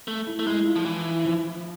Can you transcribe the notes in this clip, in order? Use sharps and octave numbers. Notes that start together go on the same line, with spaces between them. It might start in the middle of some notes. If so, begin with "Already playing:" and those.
A3
E4
A3
G#3 E4
F4
F3
E3 E4
F3